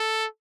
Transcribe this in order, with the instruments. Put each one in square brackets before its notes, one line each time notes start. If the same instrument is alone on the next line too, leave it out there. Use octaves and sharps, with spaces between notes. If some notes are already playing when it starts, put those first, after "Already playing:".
Already playing: [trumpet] A4